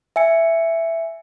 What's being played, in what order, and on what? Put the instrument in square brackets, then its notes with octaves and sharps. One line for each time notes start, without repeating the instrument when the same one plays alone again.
[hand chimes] E5 G#5 C#7